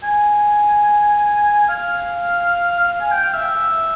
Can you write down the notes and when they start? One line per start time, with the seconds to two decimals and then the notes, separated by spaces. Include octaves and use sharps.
0.03 G#5
1.69 F5
2.80 F5
3.01 G#5
3.12 G5
3.24 F5
3.35 E5